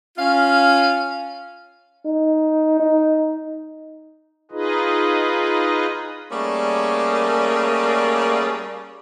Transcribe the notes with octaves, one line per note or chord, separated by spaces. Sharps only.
C#4 F4 F5
D#4
D#4
D#4 F4 G#4 B4 D#5
G3 A3 A#3 C#4 G#4 D5